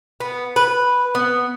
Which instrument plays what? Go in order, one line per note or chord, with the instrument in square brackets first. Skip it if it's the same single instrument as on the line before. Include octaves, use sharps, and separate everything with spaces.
[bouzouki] B3
B4
B3